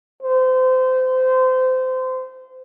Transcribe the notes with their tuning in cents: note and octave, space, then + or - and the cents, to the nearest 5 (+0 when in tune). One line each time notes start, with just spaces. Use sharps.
C5 -25